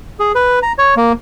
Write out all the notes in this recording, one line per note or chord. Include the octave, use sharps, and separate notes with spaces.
G#4
B4
A#5
C#5
A#3